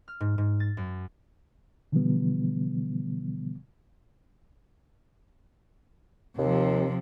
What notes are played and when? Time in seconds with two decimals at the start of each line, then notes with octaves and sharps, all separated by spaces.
0.08 F6
0.20 G#2
0.38 G#2
0.60 A6
0.77 F#2
1.92 B2 D3 E3 F3 G3 B3
6.38 D#2 C3 F3